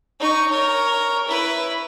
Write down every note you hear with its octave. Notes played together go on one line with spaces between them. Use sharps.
D#4 C#6
A#4 C#5
E4 B4